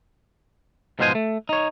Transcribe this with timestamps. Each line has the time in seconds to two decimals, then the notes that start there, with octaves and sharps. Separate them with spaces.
0.99 G#2 B2 F3 G#3 C5 G#5
1.15 A3
1.49 D#4 C#5